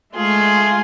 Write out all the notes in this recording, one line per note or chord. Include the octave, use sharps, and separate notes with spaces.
G#3 A3 F4 G#4